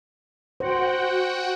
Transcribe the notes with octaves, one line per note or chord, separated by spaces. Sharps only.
F#4 C5 F#5 G5